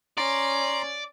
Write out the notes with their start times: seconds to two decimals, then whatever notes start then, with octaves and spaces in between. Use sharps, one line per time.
0.17 C#4 D5 A#5 C6